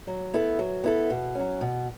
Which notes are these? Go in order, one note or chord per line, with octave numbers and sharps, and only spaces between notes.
F#3
B3 E4 A4
F#3
B3 E4 A4
B2
F#3 C#4
B2